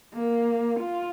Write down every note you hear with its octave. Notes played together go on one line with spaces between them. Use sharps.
A#3
F4